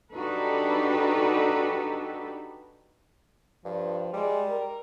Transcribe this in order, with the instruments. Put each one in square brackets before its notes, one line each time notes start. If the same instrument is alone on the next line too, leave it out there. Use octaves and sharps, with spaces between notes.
[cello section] D4 D#4 F#4 G4 A4 B4
[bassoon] G2 [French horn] F3
[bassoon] G3 [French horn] G#3
[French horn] A#4